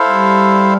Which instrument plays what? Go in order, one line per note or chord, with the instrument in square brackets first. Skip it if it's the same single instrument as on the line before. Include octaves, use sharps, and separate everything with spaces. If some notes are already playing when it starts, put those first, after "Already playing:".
Already playing: [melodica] E4 A4 C5 F5
[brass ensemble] G3